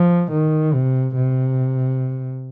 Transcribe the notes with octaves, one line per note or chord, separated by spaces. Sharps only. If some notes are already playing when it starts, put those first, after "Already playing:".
Already playing: F3
D#3
C3
C3